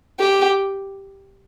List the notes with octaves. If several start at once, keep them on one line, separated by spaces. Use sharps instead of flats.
G4